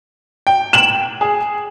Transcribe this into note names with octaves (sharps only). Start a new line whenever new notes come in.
G5
E7 F#7
G#4